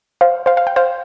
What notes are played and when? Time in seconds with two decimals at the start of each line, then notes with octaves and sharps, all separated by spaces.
0.21 C5 F5
0.46 C5 F5
0.57 F5
0.67 G5
0.76 C5 F5